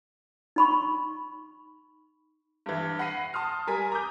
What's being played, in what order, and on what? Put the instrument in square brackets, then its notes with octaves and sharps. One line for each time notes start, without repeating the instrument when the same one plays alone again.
[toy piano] D#4 B5 C#6
[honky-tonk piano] G2 E3
F#5 B5 A#6 C7 D#7
A5 C6 D#6 F6
G3 A#4 G#5 B6
A#5 D6 D#6 G6